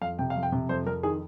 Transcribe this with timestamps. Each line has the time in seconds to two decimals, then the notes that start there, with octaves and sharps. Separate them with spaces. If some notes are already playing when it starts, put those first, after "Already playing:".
0.01 F2 F5
0.19 C3 G5
0.30 F5
0.36 F2
0.43 G5
0.52 C3
0.69 F2 C5
0.86 F2 A#4
1.03 D#3 G#4